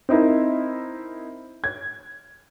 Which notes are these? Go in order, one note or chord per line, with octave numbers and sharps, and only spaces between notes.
C4 D#4 E4 A#4
G#6